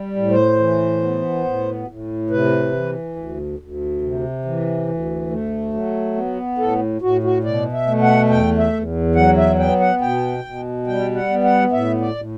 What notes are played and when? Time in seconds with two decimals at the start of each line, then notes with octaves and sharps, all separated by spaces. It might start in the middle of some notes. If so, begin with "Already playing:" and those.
Already playing: G3
0.16 A2
0.30 C5
0.59 E3
1.02 B3
1.44 A2
1.87 A2
2.30 C3 B4
2.73 E3
3.16 D2
3.59 D2
4.02 C3
4.45 E3
4.88 D2
5.30 A3
5.73 F#3
6.15 B3
6.58 A2 A4
7.02 A2 F#4
7.23 F#4
7.44 B2 D5
7.72 E5
7.87 A3
8.02 F#5
8.30 E2 G5
8.58 E5
8.73 E2
9.15 F#3 F#5
9.37 E5
9.59 B3 G5
9.80 F#5
10.01 B2 G5
10.44 B2
10.87 G3 G5
11.15 F#5
11.29 B3
11.44 F#5
11.72 A2 E5
12.01 D5
12.15 A2